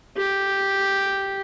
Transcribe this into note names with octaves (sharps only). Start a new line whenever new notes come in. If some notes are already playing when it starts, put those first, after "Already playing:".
G4